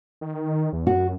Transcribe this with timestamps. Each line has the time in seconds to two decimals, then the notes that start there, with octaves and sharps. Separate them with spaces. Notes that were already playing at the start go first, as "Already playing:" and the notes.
0.21 D#3
0.73 E2
0.87 F#2 F#4